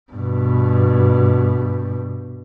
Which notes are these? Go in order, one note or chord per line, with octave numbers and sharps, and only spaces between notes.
G2 B2